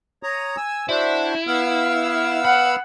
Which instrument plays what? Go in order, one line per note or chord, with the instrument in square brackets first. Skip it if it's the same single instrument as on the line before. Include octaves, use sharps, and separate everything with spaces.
[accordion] C#5 A#5 D#6
G#5 E6
[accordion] D4 F#4 C5 [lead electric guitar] E4
[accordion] B3 F5 E6
[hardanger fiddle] F#5 [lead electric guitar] B5